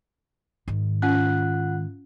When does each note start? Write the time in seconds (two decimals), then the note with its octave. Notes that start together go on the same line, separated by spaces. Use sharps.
0.68 G#2 D#3
1.02 C#4 F4 F#5 F#6